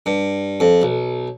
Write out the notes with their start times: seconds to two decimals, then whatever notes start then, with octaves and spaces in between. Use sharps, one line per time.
0.06 G2
0.60 F2
0.82 B1